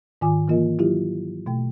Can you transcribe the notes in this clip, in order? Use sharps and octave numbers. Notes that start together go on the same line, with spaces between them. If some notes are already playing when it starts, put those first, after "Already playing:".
G#2 D#3 F4 G#5 D6
E3 F3 A#3 F4 A#4 D#5
F#3 E4 F4 G4
B2 A3 G5